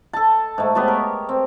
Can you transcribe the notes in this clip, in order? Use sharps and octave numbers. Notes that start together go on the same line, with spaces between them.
A4 A5
G#2 A3
B3 G4 C#5 A5
A#4
C4